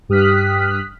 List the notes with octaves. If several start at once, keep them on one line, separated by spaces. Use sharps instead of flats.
G2 G4 D#6 F6 F#6 B6